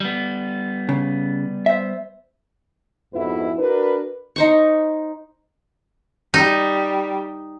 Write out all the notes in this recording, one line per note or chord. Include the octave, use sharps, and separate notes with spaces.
G3 B3
C#3
C5 E5
F2 G#2 B2 B3 E4 B4
D4 F#4 A#4 B4
D#4 C5 C#6
G3 D#4